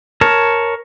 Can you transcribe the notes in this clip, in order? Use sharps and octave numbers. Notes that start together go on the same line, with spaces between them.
A#4 C#5 A5